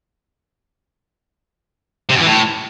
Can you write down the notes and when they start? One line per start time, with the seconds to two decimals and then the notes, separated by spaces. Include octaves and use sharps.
2.09 C3
2.15 F#2
2.20 E3
2.26 A2